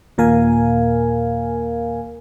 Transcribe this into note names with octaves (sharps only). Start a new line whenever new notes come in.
D#2 A#2 A#4 F5 G#5